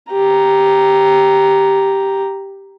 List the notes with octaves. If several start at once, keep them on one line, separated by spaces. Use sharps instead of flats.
G4 A#5